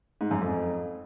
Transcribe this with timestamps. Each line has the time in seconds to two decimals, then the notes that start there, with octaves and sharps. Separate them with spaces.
0.21 G#2
0.31 F#2
0.41 F2